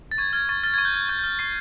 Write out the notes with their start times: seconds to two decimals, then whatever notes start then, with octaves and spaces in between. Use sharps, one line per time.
0.11 A6
0.18 C#6 G#6
0.33 F6 G#6
0.49 C#6 A6
0.63 F6 A6
0.74 C#6 G#6
0.85 G6
0.94 F6 G#6
1.09 C#6 G6
1.19 G6
1.24 F6
1.39 C#6 C7